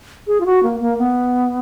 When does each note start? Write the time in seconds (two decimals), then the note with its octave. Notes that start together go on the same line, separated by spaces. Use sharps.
0.27 G#4
0.41 F4
0.46 F#4
0.63 A#3
0.80 A#3
0.98 B3